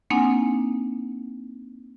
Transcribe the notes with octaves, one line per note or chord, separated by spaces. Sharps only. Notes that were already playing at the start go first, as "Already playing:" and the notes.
A#3 C4 D4 D#4 F#5 G#5